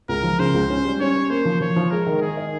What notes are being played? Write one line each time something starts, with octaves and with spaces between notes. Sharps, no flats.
C#2 A#4
F3
C#3 C5
C#2
C#4
G3
C#4 C#5
C#4
A#3 C5
F3
F3 C#5
F3
G#3 A#4
D#3
D#3 G#4
D#4